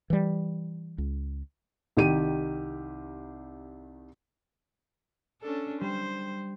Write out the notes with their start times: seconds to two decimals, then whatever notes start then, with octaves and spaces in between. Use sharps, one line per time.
0.10 E3 G3
0.98 C#2
1.97 C2 D#3 G4 D#7
5.42 C#4 D4 A4
5.81 G3 C5